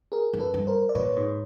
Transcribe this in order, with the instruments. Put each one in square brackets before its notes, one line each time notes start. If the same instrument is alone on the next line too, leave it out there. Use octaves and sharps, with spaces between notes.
[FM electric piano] G#4 A#4
[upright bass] F#2
[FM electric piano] A4 B4
[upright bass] G2
[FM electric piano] A#4 C5
D5
[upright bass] A#2 [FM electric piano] B4 C#5
[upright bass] G#2